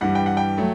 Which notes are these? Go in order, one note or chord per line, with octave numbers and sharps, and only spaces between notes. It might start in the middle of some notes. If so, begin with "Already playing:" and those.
G2 E3 G3 F#5
G5
F#5
G5
F#3 A3